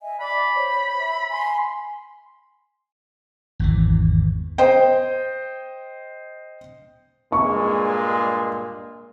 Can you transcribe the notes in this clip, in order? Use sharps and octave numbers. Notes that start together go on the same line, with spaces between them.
D#5 E5 G#5
D5 B5 D6
C5 C#5
E5
G#5 C6
G#1 E2 E3
C5 D#5 G5
G2 A#2 G#3 C#6